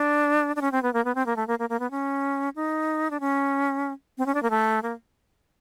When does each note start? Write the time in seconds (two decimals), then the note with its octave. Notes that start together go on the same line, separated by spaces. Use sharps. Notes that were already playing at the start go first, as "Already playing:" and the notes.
Already playing: D4
0.56 D4
0.61 C#4
0.72 C4
0.83 B3
0.93 A#3
1.04 B3
1.15 C4
1.26 A#3
1.36 A3
1.47 A#3
1.59 A#3
1.69 A#3
1.79 B3
1.91 C#4
2.56 D#4
3.10 D4
3.20 C#4
4.18 C4
4.26 C#4
4.34 D4
4.42 A#3
4.50 A3
4.83 A#3